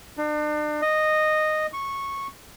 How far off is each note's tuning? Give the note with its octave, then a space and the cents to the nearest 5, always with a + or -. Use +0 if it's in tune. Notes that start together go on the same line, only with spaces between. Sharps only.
D4 +40
D#5 -10
C#6 -10